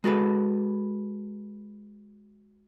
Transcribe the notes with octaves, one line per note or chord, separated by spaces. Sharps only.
G#3 F#4 A4 B4